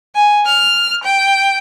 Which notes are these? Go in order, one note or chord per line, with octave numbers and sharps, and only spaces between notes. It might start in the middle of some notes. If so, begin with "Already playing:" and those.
G#5
F6
G5